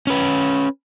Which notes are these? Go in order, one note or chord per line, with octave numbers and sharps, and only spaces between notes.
C#4 B4